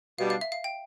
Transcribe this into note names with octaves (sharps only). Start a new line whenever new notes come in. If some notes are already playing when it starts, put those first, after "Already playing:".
B2 G3 D4 F5
F5
E5
F5
G5